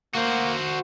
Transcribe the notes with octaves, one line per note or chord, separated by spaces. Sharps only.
A#3 F#4 C5